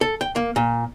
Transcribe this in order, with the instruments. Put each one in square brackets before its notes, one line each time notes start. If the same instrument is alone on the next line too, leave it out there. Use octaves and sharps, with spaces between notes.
[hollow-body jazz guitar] A4
G5
A#3
A#2